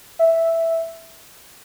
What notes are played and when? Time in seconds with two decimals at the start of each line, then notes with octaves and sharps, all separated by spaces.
0.19 E5